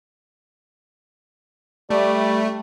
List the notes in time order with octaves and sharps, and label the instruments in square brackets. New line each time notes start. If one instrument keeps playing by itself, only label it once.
[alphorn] G3 [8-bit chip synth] A3 [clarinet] D5